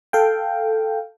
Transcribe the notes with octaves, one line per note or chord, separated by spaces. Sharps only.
A4 F5 G5